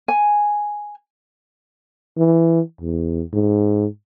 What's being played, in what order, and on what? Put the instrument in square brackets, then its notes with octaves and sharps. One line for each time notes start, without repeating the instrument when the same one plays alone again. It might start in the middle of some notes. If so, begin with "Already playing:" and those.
[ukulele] G#5
[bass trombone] E3
E2
G#2